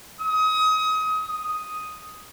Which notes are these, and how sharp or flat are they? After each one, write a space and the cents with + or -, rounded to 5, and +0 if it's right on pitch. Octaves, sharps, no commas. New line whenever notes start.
D#6 +30
D#6 +0